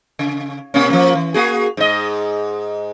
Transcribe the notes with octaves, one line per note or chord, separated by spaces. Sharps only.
C#3
B2 A#3 C#4
F3 A#3
E3
A#3 F#4 G#4
G#2 D#5